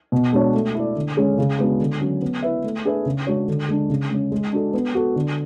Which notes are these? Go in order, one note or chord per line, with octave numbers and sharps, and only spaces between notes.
B2
G#3 D4 F#4 C#5
A3
E4 A4 D5
D3
G#3 C#4 G#4
C#3
G#3 B3 D4 F#4
D3
F#3 C#4
B3
E4 B4 E5
A3
D4 G#4 B4 E5
C#3
G#3 D4 F#4 C#5
D3
G#3 D4
C#3
G#3 C#4
G#3
D4 F#4 A4
B3
F#4 A4
D3